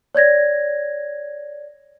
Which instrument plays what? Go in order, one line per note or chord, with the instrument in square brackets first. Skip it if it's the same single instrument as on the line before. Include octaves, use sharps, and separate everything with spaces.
[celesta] C#5 D5 G#6 A#6